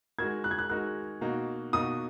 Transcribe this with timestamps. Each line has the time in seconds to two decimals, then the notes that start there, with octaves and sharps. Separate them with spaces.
0.19 G#3 D#4 F#4 A#4 G#6
0.44 F#6
0.51 G#6
0.59 F#6
0.70 G#3 D#4 F#4 A#4 F#6
1.21 B2 A#3 D#4 F#4
1.73 B2 A#3 D#4 F#4 D#6